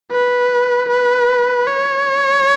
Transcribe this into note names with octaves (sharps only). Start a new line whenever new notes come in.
B4
B4
C#5